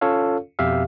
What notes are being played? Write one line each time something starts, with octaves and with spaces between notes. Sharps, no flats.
C#4 F4 A4 C#5 F5
F2 B2 G4 E5 F5